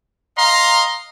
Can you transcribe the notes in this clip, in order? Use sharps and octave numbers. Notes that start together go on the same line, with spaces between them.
D#5 F5 A#5 C6